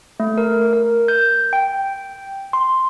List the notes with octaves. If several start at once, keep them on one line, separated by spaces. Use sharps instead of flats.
A3
A#4
A#4
G6
G5
C6